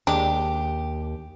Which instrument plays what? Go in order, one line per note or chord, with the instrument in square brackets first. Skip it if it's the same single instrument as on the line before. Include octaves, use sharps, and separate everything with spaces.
[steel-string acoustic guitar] D#2 [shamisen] G#3 D4 [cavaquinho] G4 D6